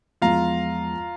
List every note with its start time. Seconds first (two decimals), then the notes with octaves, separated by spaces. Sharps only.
0.22 E2 F3 G#3 F4 F5 A#5